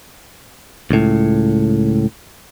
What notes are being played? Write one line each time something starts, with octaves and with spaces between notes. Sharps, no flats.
C#2 A2